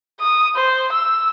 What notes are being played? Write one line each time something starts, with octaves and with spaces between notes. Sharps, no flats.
D#6
C5
E6